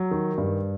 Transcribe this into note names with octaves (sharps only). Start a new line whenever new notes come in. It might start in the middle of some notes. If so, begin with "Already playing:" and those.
Already playing: F#3
D#3
G2